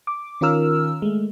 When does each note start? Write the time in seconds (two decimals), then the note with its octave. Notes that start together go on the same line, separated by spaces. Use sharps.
0.07 D6
0.41 D#3 C#4 F4 A#4 E6 F6
1.02 G#3 A3